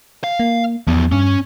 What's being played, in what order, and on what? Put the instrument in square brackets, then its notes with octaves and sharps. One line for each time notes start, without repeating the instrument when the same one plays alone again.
[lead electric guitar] F5
[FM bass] A#3
[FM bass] E2 [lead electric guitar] F3 B3
[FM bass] G2 [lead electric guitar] C#4